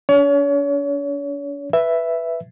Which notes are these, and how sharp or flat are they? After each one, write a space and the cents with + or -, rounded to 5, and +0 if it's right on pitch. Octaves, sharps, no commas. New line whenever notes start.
D4 -45 C#5 +35
B4 +0 E5 +5